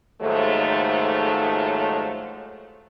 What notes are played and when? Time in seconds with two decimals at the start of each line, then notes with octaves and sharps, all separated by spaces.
0.21 D#2 G#2 F3 F#3 A3